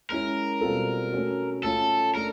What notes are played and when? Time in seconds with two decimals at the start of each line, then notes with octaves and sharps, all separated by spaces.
0.09 G#3 C#4 E4 A#4
0.61 B2 G3 C4 F4 A4
1.13 A3 C#4 F#4
1.63 A3 C#4 F4 A4
2.15 A3 D4 A#4